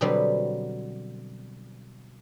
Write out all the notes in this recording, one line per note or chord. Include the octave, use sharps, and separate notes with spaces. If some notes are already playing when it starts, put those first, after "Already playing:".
B2 D3 F#3 G3 B3 C4